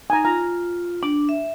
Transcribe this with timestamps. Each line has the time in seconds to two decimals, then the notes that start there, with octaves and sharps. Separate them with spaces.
0.10 D#4 G#5 A#5
0.25 F4 A#5
1.03 D4 D6
1.29 E5